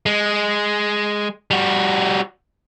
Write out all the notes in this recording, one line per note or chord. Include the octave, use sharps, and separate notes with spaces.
G#3
G3 F#4